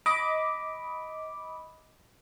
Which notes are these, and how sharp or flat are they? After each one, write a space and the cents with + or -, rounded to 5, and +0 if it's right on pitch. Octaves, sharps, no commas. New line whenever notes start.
D#5 +20 B5 +0 D6 +0